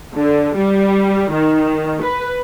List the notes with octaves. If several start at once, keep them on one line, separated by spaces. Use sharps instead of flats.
D3
G3
D#3
B4